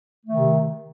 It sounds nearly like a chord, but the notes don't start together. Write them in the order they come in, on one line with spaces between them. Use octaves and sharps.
A3 D#3 C3